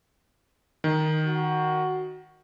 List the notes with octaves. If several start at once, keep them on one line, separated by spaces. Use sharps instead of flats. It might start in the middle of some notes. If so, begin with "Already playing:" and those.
D#3
F#4